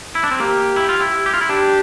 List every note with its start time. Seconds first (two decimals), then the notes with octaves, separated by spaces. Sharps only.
0.15 E4
0.24 D4
0.31 C4
0.40 A#3 G4
0.76 E4
0.89 F4
1.01 E4
1.26 G4
1.34 F4
1.41 E4
1.49 D4 G4